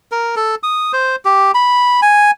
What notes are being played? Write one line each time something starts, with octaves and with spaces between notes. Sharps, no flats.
A#4
A4
D#6
C5
G4
B5
G#5